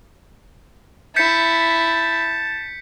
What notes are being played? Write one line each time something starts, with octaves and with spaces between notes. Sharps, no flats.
E4 A5 G6 B6 C#7